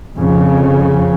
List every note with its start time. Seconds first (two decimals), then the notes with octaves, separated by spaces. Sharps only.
0.15 F2 C#3